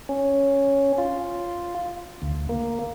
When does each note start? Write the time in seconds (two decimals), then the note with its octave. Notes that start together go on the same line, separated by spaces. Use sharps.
0.09 C#4
0.98 F4
2.22 D2
2.49 A#3